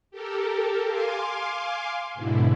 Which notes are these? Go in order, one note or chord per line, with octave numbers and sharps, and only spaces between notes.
G4 A4 A#4
F5 G#5 C6 D6
G#2 B2 D3 E4